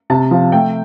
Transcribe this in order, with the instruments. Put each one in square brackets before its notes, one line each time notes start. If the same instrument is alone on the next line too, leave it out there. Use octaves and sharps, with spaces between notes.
[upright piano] C3 A5
F3
A3 G5